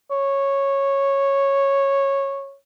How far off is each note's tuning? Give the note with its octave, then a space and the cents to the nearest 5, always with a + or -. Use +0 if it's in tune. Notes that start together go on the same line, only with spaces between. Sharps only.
C#5 -10